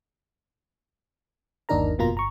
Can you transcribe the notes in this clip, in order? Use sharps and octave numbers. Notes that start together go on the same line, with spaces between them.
G1 D#2 D4 D#4 A#4 A#5
G1 F2 B2 A#3 F4 A#5
G1 A#5 C#6